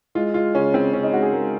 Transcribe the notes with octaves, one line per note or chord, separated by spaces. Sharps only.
G#3 F4
G#3 F4
C#3 C#4
C#3 C4
C#3 C#4
D#4
G#3 F#4
G#4
G#3 A#4